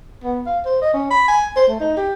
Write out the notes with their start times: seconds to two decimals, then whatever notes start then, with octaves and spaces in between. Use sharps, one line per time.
0.23 B3
0.46 F5
0.65 C5
0.82 D#5
0.94 C#4
1.11 B5
1.28 G#5
1.56 C5
1.68 A3
1.80 D#4
1.97 G4